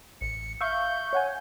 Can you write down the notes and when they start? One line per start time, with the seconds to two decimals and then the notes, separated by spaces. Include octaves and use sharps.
0.21 A1 C#7
0.61 E5 F5 C#6 G6
1.13 C#5 F#5 G#5